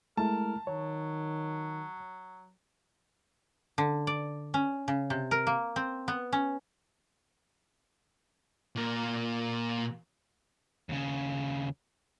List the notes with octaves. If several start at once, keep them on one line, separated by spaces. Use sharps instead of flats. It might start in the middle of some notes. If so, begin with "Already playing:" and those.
G#3 A3 E4 A#4 A5
D#3 F#3 C#5
D3
D5
C#4
C#3
C3
A#4
A#3
C4
B3
C#4
A#2 A#4
D#2 C#3